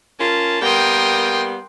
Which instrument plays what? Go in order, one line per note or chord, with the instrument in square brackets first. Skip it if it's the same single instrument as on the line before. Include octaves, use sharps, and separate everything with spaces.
[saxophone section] C#4 F4 A#4 [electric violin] A5
[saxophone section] G3 A#3 B3 [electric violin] A#4 D#6 [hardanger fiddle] G5 C6